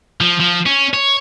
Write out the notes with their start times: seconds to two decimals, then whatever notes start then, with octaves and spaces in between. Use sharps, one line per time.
0.21 F3
0.40 F3
0.66 C#4
0.94 C#5